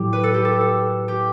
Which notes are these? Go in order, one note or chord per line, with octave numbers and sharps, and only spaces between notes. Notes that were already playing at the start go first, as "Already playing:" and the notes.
Already playing: A2 F#3 G4
B4
A4
G4
A4
A4
G4